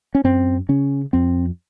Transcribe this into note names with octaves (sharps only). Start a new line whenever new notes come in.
C#4
F#2 C4
C#3 C#4
F2 C4